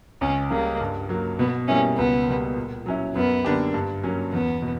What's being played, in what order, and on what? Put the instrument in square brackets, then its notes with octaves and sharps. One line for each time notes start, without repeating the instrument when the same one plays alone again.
[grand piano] C#2 [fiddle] C#4
[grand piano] C#3 G3 C#4 [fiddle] A#3
[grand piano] G2
F#3 A#3
[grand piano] B2 [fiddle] B3
[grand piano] G3 A#3 E4 [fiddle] C#4
[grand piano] C#2 [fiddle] B3
[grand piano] B2 G3 A#3
A#2
F#3 C#4 E4
[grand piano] F#2 [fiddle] B3
[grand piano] D3 A#3 D4 G4
G2
F#3 A#3 C#4
[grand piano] E2 [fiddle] B3
[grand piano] B2